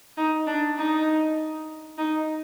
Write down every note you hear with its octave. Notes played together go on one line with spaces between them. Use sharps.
D#4
D4
D#4
D#4